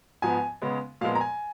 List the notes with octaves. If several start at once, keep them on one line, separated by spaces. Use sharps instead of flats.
G#2 F3 B3 G#5
C#3 G#3 B3
A#2 F3 G#3 B3 F5
A#5
G#5